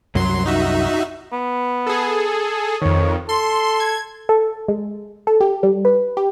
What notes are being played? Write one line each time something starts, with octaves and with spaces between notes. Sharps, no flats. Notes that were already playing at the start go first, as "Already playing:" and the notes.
C2 F#2 F#3 C6
D#4 F#4 E5
B3
G#4 A4
F2 D#3 C#5
A4 C6
G#6
A4
G#3
A4
G4
G3
B4
G4